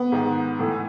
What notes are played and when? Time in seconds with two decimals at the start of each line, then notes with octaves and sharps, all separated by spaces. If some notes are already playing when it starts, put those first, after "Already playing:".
Already playing: B3
0.12 G#2 D#3
0.59 A2 E3